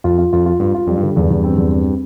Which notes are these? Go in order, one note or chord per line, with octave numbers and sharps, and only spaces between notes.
F2 F4
F4
F2 F4
F4
G2 F4
F4
F2 G3
G2
D3
E2 G2
E2
C4
E2
C4